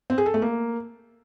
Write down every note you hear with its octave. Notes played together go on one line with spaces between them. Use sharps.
C4
G#4
A4
A3
A#3